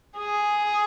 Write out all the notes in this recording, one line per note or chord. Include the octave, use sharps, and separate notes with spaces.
G#4